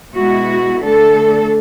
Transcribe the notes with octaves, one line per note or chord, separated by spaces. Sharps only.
B2 G#3 B3 E4 F#4
D3 A3 D4 A4